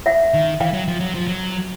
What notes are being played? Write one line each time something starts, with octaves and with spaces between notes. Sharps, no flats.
E5 F#5
D#3
E3 F5 G5
F#3
F3
F#3
F3
F#3